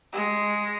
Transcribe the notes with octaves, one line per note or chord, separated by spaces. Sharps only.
G#3